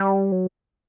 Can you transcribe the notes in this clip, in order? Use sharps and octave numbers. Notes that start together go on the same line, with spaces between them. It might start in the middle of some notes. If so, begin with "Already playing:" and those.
Already playing: G3
F#3